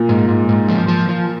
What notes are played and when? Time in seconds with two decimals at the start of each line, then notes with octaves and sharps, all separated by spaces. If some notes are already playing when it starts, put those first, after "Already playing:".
Already playing: A#2
0.09 G#2
0.29 G#2
0.49 G#2
0.69 F3
0.88 F3
1.09 F3